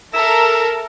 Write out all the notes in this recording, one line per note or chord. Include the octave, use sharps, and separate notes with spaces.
A4 A#4 E5